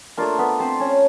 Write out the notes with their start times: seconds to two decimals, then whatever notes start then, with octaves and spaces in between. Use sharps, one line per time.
0.17 A3 A#3 D4 F4 A#4
0.39 B3 B4
0.60 C4 C5
0.80 C#4 C#5